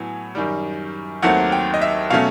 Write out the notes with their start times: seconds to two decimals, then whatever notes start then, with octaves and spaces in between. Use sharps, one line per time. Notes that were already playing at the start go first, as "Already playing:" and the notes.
Already playing: A2 F#3 B3 G#5
0.35 F#2 D#3 G3
1.22 D#2 D#3 F#3 A3 C4 F#5
1.52 G5
1.74 D#5
1.81 E5
2.10 B2 F#3 A3 C#4 F5